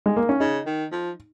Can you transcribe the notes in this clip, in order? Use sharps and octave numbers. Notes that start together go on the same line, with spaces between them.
G#3
A#3
C#4
C#3 D#4
D#3
F3